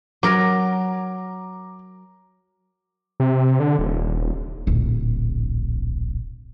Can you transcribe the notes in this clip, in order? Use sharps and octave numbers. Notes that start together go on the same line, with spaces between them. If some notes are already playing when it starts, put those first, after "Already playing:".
F#3 A#4 A#5 D6
C3
D3
D#1
D1 A#1